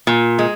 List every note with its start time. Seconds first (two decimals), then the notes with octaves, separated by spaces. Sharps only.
0.07 A#2
0.39 G#3